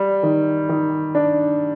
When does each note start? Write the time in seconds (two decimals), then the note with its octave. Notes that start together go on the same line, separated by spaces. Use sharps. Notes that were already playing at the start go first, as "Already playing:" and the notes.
Already playing: G3
0.23 D#3
0.69 D#3
1.15 D4